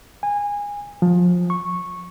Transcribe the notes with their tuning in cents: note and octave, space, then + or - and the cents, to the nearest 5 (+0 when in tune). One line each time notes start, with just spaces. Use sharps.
G#5 -20
F3 +25
C#6 -10